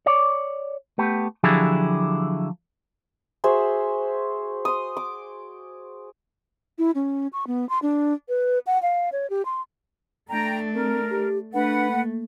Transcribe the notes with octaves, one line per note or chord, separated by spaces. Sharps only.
C#5 D5
A3 B3 G4
D3 F3 F#3 E4 G4 G#4
F#4 G#4 C5 E5
C6 D#6
D6
E4
C#4
C#6
B3
C6
D4
B4
F#5
F5
C#5
G4
C6
A3 D4 G5 A#5
C4 A#4
G4
A3 D4 B4 F#5
A#3